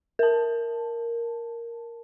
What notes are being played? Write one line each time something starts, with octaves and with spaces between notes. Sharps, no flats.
A#4 A5